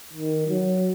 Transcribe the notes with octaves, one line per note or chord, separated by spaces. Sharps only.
D#3
F#3